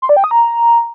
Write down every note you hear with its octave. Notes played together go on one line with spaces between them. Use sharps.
C6
D5
G5
D#6
A#5